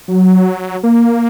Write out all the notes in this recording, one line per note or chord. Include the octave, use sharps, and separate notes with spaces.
F#3
A#3